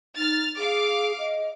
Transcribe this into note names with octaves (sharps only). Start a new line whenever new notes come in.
D#4 F6 A6
G#4 F5 D6
D#5